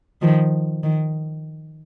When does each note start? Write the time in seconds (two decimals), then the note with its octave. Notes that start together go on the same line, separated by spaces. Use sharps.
0.22 D#3 F3
0.83 D#3